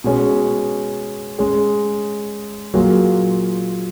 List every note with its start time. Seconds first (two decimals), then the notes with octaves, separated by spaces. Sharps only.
0.04 B2 G#3 C#4 G#4
1.39 G#3 C#4 G#4
2.74 A#2 F#3 A#3 F4 G#4